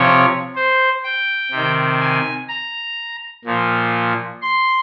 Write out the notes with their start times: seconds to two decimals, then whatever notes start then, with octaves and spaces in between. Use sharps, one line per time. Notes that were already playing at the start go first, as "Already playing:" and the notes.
Already playing: C3 F3 C#5
0.55 C5
1.04 G5
1.51 C3 D#3
2.01 G#5
2.49 A#5
3.45 A#2 F3
4.42 C6